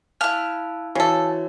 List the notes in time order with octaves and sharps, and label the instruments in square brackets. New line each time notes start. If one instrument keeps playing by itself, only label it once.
[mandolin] E4 F6 [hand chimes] F5 A5 F#6
[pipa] C#3 A4 [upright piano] E3 [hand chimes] F#4 C#5